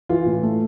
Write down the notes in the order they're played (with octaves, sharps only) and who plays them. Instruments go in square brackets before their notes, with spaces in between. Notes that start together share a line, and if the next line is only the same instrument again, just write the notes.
[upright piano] E3 [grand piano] F4
[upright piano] A2
A3